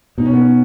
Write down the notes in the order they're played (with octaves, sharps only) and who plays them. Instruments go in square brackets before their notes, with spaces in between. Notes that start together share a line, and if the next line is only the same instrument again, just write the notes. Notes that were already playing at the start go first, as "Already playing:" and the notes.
[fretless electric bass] B2 [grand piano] D#4
[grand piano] C#4
B3
C#4